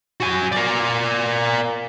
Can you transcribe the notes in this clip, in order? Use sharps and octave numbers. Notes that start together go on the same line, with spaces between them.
F#4 G#5
A#4 D5